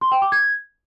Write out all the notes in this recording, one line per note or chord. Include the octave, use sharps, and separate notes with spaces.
C6
G5
D6
G#6